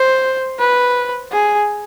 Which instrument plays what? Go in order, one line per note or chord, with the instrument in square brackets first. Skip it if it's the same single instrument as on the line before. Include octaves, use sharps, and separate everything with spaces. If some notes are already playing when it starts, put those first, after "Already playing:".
Already playing: [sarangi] C5
B4
G#4